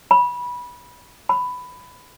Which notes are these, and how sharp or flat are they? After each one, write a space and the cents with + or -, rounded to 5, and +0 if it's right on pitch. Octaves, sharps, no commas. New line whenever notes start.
B5 -20
B5 +10